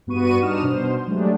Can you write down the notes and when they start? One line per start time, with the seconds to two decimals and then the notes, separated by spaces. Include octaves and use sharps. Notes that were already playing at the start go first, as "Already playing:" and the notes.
0.07 G2 B3 F#4 B4 C#6 D#7
0.42 G3 D4 D#4 D#6 F6 E7
0.62 B2 C5
1.07 F#3 G#3 A3 D4 G4